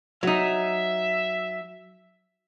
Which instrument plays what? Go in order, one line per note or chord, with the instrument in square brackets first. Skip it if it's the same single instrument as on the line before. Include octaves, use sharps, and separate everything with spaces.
[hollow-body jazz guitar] F#3 D#4 [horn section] E5